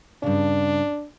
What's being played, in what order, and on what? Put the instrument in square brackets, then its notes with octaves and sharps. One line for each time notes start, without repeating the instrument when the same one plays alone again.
[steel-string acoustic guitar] G2 C#3 [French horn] D4